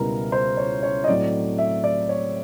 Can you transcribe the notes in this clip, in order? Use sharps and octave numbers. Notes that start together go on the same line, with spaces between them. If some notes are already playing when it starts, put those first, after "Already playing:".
Already playing: C#2 B2 G3 B3 E4 A#4
C5
C#5
C#5
D#5
A2 F#3 A3 C4 D5
E5
D5
C#5